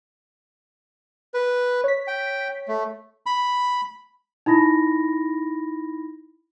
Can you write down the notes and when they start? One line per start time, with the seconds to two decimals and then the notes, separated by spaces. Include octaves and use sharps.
1.34 B4
1.84 C#5 B6
2.08 G5
2.68 A3
3.26 B5
4.46 D#4 E4 B5 A#6